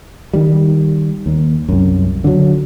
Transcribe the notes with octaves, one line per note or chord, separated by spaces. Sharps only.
D#3 G3
D#2
C2 F#2
D3 F#3